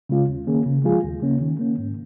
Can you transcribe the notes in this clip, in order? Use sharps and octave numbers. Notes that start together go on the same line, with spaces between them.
C#3 G#3 C#4 F4
D#2
D#3 A#3 C#4 G#4
C#3
F3 G#3 F4 G#4
D#2
C#3 A#3 C#4
D#3
A#3 C#4
G#2